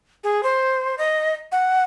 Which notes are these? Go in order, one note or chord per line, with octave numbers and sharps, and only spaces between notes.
G#4
C5
D#5
F#5